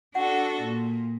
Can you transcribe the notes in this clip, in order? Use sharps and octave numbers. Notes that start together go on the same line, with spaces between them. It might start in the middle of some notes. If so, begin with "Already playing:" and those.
D4 F#4 A4 F#5
A#2